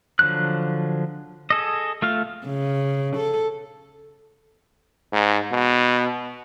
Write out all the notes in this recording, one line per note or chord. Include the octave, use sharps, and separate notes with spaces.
D3 F3 F#3 F#6
G#4 A4 D#5
A3 F4 F5
C#3
A4
G#2
B2